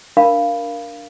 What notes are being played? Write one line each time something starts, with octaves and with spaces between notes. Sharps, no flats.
D4 A#4 F5 B5